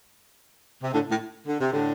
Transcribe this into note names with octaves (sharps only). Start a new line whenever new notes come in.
C3
A2 D3
A2
D3
C3
A2 D3